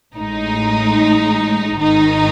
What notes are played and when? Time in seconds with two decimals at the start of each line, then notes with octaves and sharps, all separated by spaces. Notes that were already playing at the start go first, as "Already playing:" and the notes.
0.15 A1 A2 G#3 D#4
1.80 G#1 G#2 D#3 D#4